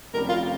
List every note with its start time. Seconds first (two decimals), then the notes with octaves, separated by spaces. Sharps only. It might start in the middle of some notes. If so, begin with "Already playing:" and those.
0.14 F1 F2 C3 G3 C#4 A#4
0.29 F4